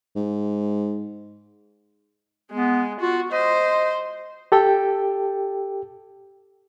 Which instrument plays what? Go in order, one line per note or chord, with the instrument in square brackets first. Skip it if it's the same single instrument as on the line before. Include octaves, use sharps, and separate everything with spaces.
[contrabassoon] G#2
[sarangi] G#3 [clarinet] B3
[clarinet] F4 [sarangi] F#4
[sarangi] C5 [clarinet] D#5
[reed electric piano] G4 A4 G5